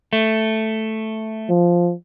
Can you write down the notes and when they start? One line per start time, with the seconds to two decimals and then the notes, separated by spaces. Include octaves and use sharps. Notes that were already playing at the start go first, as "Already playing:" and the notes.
0.13 A3
1.49 F3